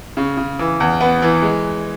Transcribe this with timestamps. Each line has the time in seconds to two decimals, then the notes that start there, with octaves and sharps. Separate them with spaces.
0.17 C#3
0.37 C#3
0.59 E3
0.80 E2
1.01 B3
1.22 E3
1.42 G#3